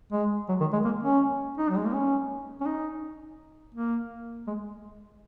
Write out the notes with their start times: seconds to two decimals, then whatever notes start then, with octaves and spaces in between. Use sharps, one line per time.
0.12 G#3
0.49 F#3
0.60 D#3
0.73 G#3
0.85 A#3
1.03 C#4
1.58 D#4
1.70 F#3
1.77 G#3
1.86 A#3
1.93 C#4
2.61 C#4
2.66 D#4
3.74 A#3
4.47 G#3